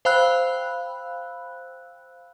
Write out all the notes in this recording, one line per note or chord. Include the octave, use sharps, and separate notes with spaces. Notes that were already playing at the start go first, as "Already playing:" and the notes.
C5 F5 G5 B5 E6 F#6